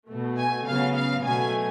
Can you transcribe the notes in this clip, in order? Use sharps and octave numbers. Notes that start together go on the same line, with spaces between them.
B2 A3
G#5
C#3 F#3 B3 F5
F5
B2 F#3 A3 G#5